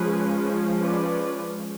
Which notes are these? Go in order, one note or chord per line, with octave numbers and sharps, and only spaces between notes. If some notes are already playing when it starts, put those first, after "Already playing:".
Already playing: F3 G#3 C#4 G#4 B4
B4 D5